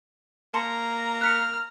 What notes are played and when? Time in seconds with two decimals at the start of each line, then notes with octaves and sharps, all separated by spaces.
0.54 A#3 A5 A#5 C6 C#7
1.21 F6 F#6 B6 C#7